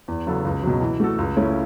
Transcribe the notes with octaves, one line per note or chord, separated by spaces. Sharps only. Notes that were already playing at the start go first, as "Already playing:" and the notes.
E2
C#3 F#3 B3 A4
C#2
B2 F#3
E3
A3 F#4 A4
C#2
C#3 A3 C#4 E4